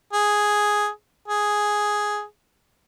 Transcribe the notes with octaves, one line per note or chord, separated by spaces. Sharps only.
G#4
G#4